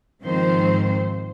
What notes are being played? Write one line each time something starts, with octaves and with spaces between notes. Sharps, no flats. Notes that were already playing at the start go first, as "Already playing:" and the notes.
G#2 D#3 F3 C4 C5